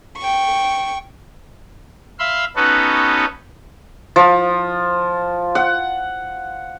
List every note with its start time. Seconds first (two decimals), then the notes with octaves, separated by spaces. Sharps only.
0.17 G5 C#6
2.19 E5 F5 B5 C6
2.56 B3 C#4 D#4 F#4 A4 B4
4.16 F3
5.55 F#5